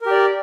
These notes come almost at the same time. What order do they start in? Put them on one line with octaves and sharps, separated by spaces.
A#4 G4 D5